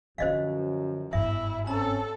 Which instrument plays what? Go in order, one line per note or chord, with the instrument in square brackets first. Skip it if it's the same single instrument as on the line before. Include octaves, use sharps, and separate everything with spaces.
[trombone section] F#2 F3 [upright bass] D3 D4 [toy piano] C5 D#5 F5
[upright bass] G1 G#2 [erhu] E4 [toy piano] E5
[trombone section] C4 C#4 [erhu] A4 [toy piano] A#5